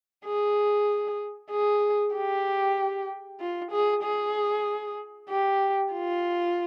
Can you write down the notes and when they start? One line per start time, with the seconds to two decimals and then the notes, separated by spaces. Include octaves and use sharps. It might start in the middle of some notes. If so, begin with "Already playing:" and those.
0.25 G#4
1.51 G#4
2.14 G4
3.40 F4
3.71 G#4
4.03 G#4
5.29 G4
5.92 F4